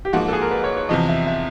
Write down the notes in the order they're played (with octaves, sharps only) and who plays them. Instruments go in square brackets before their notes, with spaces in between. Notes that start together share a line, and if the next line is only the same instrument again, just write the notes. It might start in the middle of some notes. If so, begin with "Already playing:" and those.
[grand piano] G4
[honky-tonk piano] G#2 F3 A#3 [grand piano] F#4
[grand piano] A4
G#4
A#4
B4
C#5
C#5
[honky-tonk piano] E2 C3 F3 [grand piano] D#5
[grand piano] E5
E5